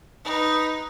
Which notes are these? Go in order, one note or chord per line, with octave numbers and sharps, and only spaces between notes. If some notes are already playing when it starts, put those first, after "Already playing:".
D#4 B4